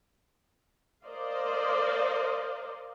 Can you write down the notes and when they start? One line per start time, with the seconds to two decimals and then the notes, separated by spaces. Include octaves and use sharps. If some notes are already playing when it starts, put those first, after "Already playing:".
1.04 A#4 C5 D5 D#5 F5